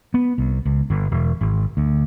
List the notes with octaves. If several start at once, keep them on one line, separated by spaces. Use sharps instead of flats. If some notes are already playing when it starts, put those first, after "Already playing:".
B3
C2
C#2
G1
E1
G#1
D2